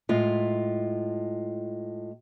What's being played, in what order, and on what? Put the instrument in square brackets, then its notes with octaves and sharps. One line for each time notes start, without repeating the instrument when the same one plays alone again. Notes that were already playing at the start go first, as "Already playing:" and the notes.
[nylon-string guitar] A2 G#3 F4 E5